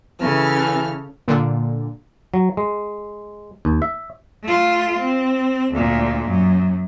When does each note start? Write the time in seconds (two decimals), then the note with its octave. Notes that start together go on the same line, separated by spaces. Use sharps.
0.21 C#3 E3 A4 F6
1.28 A#2 D3
2.34 F#3
2.57 G#3
3.65 D#2
3.82 E5
4.43 A3 F4
4.99 C4
5.73 D2 A#2
6.27 F#2